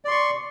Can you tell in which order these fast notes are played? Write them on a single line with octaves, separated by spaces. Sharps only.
D5 C6 C#6